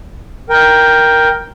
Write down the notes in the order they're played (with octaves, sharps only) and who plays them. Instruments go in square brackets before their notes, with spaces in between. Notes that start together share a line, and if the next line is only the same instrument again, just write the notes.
[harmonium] A#4 G5